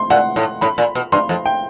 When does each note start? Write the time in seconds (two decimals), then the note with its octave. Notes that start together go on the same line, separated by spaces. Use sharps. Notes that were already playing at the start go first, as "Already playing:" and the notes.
Already playing: C6
0.10 A#2 F#5
0.36 A2
0.61 A2 B5
0.78 A#2
0.95 B2
1.12 G2 C6
1.29 F2
1.46 G5